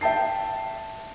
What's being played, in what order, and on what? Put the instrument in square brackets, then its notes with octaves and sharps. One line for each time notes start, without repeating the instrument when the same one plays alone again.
[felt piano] E5 G5 A5 C7